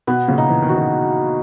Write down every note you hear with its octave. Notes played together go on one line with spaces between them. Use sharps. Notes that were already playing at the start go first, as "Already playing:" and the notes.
B2 B3
A#2 C#3
D#4
E3
D#3
F#4
C#3